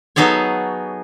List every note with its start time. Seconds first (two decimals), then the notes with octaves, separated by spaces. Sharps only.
0.16 F#3 B3 D#4 G#4 A4 C#5